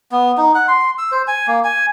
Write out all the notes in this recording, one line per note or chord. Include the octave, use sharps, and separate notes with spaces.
B3
D#4
F#5
C6
E6
C5
G#5
A#3
G#5